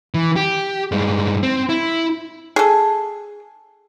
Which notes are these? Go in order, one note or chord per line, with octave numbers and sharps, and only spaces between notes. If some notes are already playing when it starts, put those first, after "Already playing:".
E3
G4
G2 G#3
C4
E4
G#4 A4